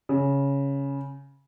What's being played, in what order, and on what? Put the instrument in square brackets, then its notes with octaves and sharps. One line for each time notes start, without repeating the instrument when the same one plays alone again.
[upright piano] C#3